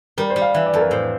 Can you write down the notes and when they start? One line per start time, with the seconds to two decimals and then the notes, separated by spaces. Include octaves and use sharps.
0.17 G3 A#4
0.30 C5
0.36 G3
0.42 F5
0.54 E3 E5
0.66 D5
0.74 F2 A4
0.79 A#4
0.91 A2 C5